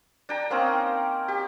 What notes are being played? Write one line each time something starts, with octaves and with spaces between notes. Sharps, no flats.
D4 G5 A#5
A#3 C4 C#4 D#4
G4